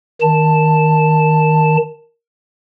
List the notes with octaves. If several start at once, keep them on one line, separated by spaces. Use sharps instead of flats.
D#3 A5